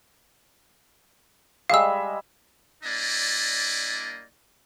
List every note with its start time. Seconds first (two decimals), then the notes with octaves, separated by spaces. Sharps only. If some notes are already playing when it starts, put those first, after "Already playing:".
1.70 G3 G#3 E5 F5 E6
2.83 G3 A#3 D4 E4 D5 D#5